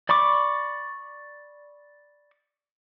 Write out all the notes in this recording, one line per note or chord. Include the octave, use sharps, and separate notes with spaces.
D5 B5 C#6 D6